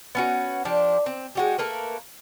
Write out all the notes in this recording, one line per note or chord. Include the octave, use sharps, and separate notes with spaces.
B3 C#4 F#4
F3 D4 G4
C4
G#3 F#4 G4
A3 A#3 A#4 B4